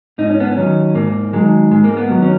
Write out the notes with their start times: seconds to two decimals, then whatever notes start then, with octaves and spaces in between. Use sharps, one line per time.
0.18 G#2 D#4
0.29 C#4
0.40 B3
0.51 C#4
0.57 D#3 F#3
0.95 G#2 A#3
1.33 D#3 F#3 G#3
1.71 G#2 G#3
1.84 A#3
1.97 B3
2.09 D#3 F#3
2.22 C#4